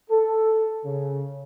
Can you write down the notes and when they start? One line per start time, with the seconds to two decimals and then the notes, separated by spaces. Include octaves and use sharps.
0.10 A4
0.85 C#3